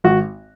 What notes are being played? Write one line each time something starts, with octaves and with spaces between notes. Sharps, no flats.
G#1 F#4